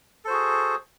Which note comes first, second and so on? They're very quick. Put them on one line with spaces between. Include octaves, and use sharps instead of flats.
A4 C5 F#4 G#4